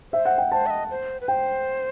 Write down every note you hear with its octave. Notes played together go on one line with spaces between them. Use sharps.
C5 E5
F#5
G5
C5 A5
E5
D#5
C5
B4
C5 G5